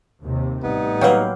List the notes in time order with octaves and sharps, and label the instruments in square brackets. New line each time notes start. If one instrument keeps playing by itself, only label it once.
[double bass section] D#2 C3
[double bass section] A1 [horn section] G3 B3 D#4
[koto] F#3 A#3 [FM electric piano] B4 F5 G5